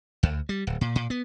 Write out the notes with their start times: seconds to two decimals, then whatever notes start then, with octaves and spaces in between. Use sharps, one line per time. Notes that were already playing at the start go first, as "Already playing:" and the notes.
0.23 D2
0.49 G3
0.67 D1
0.81 A#2
0.96 A#2
1.10 B3